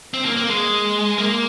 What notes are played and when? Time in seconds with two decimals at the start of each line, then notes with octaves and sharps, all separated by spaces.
0.14 C4
0.25 A#3
0.37 A#3
0.49 G#3
1.18 A#3